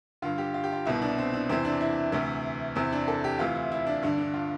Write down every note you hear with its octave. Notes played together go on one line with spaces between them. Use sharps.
G2 D3 F4
G4
F4
G4
F4
C2 B2 E4
D4
C4
D4
E2 C3 E3 C4
D4
E4
D2 C3 E3
E2 C3 E3 C4
D4
A4
G4
D2 C3 E3 F4
E4
E4
D4
G2 D3 D4
D4
F4